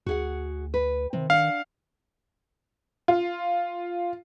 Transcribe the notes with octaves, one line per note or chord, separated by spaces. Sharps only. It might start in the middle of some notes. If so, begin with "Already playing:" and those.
D2 F#4 G#4 F#5
B4
C3 D#3
D4 F5 F#5
F4